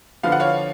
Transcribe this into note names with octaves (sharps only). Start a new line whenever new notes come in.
D3 F3 B3 F5
F#5
C#5 F5